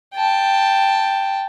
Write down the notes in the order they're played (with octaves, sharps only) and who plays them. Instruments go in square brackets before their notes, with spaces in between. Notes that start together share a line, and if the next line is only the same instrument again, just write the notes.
[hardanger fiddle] G5 A5